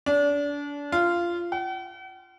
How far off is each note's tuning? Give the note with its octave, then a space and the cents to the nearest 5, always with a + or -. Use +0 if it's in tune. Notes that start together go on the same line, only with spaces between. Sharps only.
D4 -30
F4 -15
F#5 +45